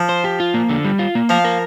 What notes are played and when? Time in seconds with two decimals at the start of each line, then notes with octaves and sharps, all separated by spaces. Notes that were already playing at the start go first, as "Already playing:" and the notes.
Already playing: F3
0.09 C5
0.24 G4
0.40 F4
0.54 A#3
0.69 D3
0.84 G3
0.99 F4
1.15 A#3
1.29 F3 F5
1.44 A#4